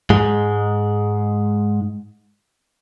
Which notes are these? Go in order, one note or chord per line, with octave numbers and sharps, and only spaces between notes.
G#2 G#3